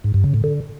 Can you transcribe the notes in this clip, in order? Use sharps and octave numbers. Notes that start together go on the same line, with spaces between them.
G#2
G2
C#3
A2
D3